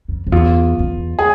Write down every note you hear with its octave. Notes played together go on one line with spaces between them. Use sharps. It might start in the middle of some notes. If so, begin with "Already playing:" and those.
F2
F2
E2 F4
E2
G#4